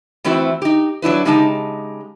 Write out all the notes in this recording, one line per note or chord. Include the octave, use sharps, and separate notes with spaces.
E3 A3 C4 E4 F#4 C5
D#4 G4
F#3 D4 E4 B4
C#3 G#3 D#4 G4 G#5 A5